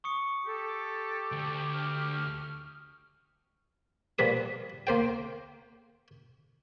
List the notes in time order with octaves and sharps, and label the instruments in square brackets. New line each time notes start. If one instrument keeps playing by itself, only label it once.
[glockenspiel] C#6 D#6 C#7
[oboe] G4 [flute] A4
[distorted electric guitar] D2
[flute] F6
[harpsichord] A#2 F3 G3 B4 D#6
A#3 C5 G5